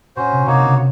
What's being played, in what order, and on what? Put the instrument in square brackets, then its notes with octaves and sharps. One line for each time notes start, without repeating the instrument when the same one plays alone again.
[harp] A#2 [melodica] C#4 F#4 C5
[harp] C3
[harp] C3 [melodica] A#3 D#4 F#4 C#5
[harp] C#3